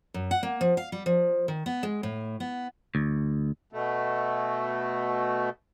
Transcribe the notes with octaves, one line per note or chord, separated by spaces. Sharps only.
F#2
F#5
A#3
F3
F5
G3
F3
D#3
B3
G#3
A2
B3
D2
B2 A3